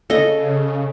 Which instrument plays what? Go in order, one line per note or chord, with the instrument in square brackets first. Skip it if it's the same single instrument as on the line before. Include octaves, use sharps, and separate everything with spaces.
[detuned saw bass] C#3 [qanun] A4 D#5